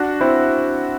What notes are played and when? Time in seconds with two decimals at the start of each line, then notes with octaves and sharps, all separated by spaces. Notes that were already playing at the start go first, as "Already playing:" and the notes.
Already playing: D4 F#4
0.21 C4 E4